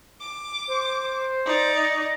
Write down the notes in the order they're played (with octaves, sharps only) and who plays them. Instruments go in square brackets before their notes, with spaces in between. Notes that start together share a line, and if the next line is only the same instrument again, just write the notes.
[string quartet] D6
[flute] C5
[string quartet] D#4 D5
[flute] D#5